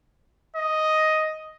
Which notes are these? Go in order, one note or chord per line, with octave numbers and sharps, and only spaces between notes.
D#5